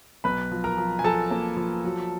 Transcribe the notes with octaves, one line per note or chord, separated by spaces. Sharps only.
B1 B4 B5
F3
A#4 A#5
F3
G#5
F3 A4 A5
A#3
F3
F#3